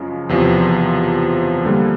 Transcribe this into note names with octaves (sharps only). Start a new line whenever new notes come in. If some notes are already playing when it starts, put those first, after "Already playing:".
Already playing: F#2 C#3 F3 G#3
E2 C3 F3
D3 G3 A#3